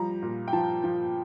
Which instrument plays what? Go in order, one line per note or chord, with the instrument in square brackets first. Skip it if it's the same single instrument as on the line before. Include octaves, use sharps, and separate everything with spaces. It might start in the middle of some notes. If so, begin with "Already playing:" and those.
Already playing: [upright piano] F3 G3 A#5
A#2
G5
F3 A5
F3